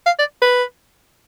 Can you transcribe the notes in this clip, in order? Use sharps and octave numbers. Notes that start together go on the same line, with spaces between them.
F5
D5
B4